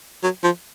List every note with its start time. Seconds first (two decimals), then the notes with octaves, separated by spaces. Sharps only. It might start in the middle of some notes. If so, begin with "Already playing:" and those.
0.23 F#3
0.44 F3